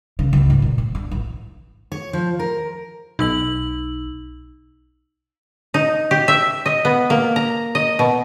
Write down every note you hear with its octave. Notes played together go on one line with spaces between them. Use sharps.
C#3
C#2
G#2
A#2
F3
D4
A1
C#5
F3
A#4
B1 D#4 E6 F#7
D#4
G4
E5
D#5
B3
A#3
A#5
D#5
B2